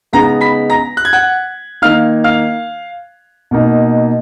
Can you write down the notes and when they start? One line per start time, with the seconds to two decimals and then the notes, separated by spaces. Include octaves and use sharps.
0.13 C#3 G#3 B3 D#4 A#5 A#6
0.41 B5 B6
0.70 A#5 A#6
0.97 F#6
1.05 G#6
1.13 F#5 F#6
1.82 D#3 A#3 D#4 F5 F6
2.24 F5 F6
3.51 B2 A#3 D#4